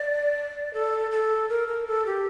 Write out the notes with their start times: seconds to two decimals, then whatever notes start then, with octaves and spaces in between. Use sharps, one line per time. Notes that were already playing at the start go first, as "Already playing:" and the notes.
Already playing: D5
0.74 A4
1.11 A4
1.49 A#4
1.68 A#4
1.87 A4
2.06 G4